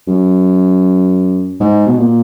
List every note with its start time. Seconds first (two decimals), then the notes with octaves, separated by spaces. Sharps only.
0.07 F#2
1.60 G#2
1.86 B2
1.98 A#2